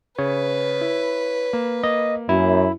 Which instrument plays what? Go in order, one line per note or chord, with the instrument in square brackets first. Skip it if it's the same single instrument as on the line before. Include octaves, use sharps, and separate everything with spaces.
[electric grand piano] C#3 [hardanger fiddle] B4 [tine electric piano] C#5
[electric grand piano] E4
A#3
[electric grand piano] A#3 [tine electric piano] D#5
[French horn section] F#2 [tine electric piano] E4